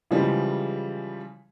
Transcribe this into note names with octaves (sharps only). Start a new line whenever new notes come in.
C#3 E3 F3 G3 G#3